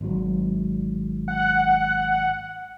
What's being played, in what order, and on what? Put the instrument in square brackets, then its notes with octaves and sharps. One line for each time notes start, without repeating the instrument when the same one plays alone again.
[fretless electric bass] G#1 G#2 F#3
[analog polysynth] F#5